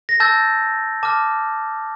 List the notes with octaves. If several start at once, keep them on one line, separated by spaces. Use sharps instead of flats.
A#6
A5 E6 G6 A6
A5 D6 F6